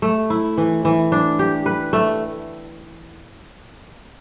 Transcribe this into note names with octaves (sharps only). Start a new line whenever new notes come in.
A3
E4
E3
E3
D4
G4
B4
A3